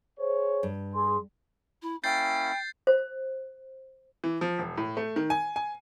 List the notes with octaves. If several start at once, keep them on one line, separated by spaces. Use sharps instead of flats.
G#4 C5 C#5
G2
G#4 C6
E4
A#3 C#4 E4 G5 G6 A6 C7
C5
E3
F3
E1
A2
A3
D#3
G#5
G#5